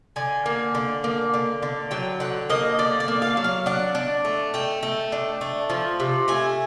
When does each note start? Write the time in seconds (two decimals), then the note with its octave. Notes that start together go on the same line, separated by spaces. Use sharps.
0.16 D3 G#5
0.46 A#3
0.75 D3
1.04 A#3
1.34 D3
1.63 D3
1.91 F#3 G5
2.20 D3 F#5
2.50 A#3 D#5
2.79 D3 D5
3.00 D5
3.08 A#3
3.22 F5
3.37 F#3
3.44 F5
3.66 D4 F#5
3.95 D4
4.25 A3
4.54 A3 G5
4.83 A3
5.12 D4
5.41 A3
5.70 F3
6.00 C3
6.28 A3 G#5